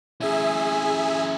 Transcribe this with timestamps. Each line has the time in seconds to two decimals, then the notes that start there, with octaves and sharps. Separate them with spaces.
0.21 C#4 E4 G#4 E5 G#5